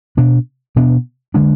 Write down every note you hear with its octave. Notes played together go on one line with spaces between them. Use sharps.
B2 B3 D4
B2 B3 D4
D3 G#3 D4